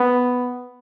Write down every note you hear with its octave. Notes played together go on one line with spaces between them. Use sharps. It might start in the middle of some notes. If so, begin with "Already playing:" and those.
Already playing: B3